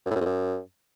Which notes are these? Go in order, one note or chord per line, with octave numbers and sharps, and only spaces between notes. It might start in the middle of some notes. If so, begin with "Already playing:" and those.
F#2
A2
F#2
F2
F#2